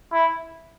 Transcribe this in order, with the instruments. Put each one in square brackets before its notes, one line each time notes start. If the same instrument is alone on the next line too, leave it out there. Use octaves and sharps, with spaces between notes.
[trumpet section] E4